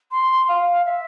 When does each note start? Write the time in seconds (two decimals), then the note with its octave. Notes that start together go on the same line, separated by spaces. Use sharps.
0.11 C6
0.49 F5
0.86 E5